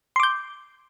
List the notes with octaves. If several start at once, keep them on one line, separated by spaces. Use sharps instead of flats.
C6 D6 G6